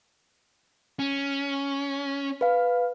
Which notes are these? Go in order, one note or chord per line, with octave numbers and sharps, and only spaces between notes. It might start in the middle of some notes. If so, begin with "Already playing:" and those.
C#4
B4 F5